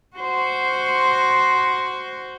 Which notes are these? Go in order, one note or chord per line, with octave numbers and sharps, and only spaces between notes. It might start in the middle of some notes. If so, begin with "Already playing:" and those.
F#4 C5